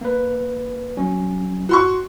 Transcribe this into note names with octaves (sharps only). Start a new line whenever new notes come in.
A#3 B4
F#3 C#4
F#4 C6 C#6